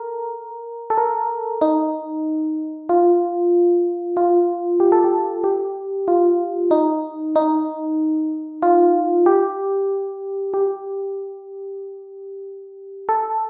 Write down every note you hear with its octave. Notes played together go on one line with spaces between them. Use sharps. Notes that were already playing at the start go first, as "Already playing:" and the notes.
Already playing: A4 A#4
A4
A#4
D#4
F4
F4
G4
A4
G4
G4
F4
D#4
D#4
F4
G4
G4
A4